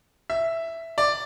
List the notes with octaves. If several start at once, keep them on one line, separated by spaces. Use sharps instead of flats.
E5
D5